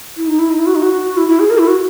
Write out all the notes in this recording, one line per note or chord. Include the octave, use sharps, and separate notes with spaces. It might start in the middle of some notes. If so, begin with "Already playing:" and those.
E4
D#4
E4
D#4
E4
F#4
D#4
F#4
E4
E4
G#4
A#4
E4
F#4